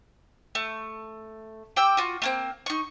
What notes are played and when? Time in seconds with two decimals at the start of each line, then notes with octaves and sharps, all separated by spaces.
0.55 A3
1.76 G4 G5 E6
1.97 F4 F#4
2.22 A3 A#3 C4
2.66 D#4 C#6